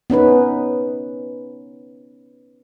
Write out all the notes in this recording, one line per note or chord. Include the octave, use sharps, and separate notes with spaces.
B3 C#4 D#4 B4